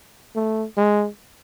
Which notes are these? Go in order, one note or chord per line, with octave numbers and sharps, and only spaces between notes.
A3
G#3